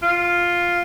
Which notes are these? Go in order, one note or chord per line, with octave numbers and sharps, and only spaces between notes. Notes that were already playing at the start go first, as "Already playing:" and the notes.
F4